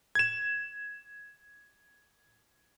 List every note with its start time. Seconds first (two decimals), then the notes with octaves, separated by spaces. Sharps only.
0.15 G#6 E7